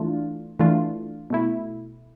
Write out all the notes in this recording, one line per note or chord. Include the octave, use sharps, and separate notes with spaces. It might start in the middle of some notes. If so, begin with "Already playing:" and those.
Already playing: E3 A3 D4 F4
E3 A3 D4 F4
B2 A3 E4